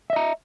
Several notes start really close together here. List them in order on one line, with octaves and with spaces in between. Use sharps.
E5 D#5 A#5